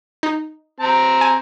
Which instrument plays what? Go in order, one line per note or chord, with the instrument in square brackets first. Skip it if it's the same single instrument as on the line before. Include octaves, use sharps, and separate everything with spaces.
[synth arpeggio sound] D#4
[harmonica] C4 A#5
[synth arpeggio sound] G#5